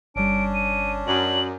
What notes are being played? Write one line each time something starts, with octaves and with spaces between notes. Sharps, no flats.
G1 G3 C#4 D4 D7
D#7
F#2 D5 D6 D#6 F#7